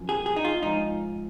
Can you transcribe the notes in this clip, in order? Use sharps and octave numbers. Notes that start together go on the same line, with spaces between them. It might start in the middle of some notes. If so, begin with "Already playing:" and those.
Already playing: F#2 F3
G#4
G#4
D#4
F4
G#2 F3 D#4